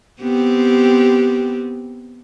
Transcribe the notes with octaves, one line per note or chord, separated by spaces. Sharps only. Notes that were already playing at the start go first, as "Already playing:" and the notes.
B3 C4 G4